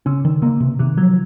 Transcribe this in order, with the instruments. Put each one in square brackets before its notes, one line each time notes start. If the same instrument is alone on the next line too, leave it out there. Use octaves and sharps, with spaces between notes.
[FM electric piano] C#3 [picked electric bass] C#4
[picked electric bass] D#3
[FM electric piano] C#3 [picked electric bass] A#3
[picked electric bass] C3
[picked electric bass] C3 [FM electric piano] D#3
[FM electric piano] F3 [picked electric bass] F#3